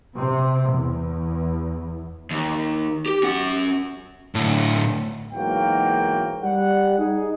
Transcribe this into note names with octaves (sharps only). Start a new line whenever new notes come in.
C3
E2
D#2
G4
C#4 F#5
A2 D3
B1 G#2 E3 A#3 F#4 G5
G3 F#5
D#4 G#4